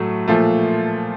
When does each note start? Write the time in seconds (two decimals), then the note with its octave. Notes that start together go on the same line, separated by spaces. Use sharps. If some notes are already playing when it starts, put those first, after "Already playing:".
Already playing: A2 F#3 A3
0.28 A#2 F3 A3